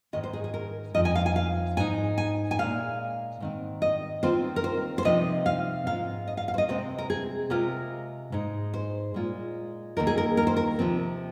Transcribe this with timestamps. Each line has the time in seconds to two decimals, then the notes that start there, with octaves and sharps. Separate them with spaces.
0.13 G#2 D#3 G#3 D#5
0.24 C5
0.33 G#4
0.44 G#4
0.54 A#4
0.95 F2 F3 C4 D#4 D#5
1.05 G#5
1.15 F5
1.26 G#5
1.36 F5
1.77 G#2 G#3 D#4 G#5
2.18 G#5
2.51 G#5
2.59 A#2 F3 G#3 F5
3.40 G#2 D#3 C4
3.82 D#5
4.23 D#3 C4 F4 C5
4.56 A#4
4.64 C5
4.98 C5
5.05 C3 F3 C4 D#4 D#5
5.46 F5
5.86 G#2 G#3 F4 F5
6.28 D#5
6.37 F5
6.48 F5
6.54 C5
6.58 D#5
6.68 C3 G#3 C4 C5
6.98 A#4
7.10 G#4
7.50 C3 G#3 F4 A#4
8.32 G#2 G#3 D#4
8.74 C5
9.14 A#2 G#3 F4
9.97 D#2 D#3 A#3 D#4 A#4
10.07 G#4
10.18 A#4
10.37 A#4
10.47 C5
10.56 A#4
10.79 C3 F3 C4